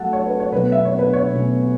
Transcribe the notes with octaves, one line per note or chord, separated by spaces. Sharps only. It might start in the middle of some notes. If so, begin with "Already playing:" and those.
Already playing: F#3 A3 F#4 A4 F#5 A5
C#5
B4
C#5
B2 F#3 B3 B4
E5
C#5
B4
C#5
B2 A3 C#4